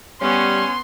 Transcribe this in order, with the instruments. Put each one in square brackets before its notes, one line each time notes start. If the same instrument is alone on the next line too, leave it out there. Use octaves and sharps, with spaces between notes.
[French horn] G3 [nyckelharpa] B3 [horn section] C#4 [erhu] C6